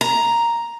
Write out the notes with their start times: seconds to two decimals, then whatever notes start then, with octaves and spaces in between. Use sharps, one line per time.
0.01 A#5